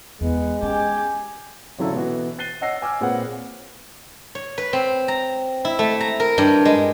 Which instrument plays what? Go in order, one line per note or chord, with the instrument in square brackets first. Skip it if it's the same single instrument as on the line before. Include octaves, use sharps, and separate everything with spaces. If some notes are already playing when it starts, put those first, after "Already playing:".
[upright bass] E2 [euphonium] G#3 [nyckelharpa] B3
[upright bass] C#4 [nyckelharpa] G4 [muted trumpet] G#5
[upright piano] G#1 C#3 F#3 E4 A4 C#5
B2 E3 F#4
F#6 A6 C7 D#7 G7
C#5 D#5 F#5 E6 A#6 C7
G#5 D6 E6 F6
A#2 C4 G#4 B4 C#5 F#5
[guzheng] C#5
B4
C4
A#5
E4
A3
A#5
A#4
G2
G#3